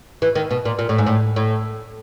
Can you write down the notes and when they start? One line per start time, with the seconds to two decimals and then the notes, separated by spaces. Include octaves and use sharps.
0.22 E3
0.35 D#3
0.51 B2
0.65 A#2
0.79 A#2
0.89 A2
0.98 G#2
1.07 A2
1.36 A2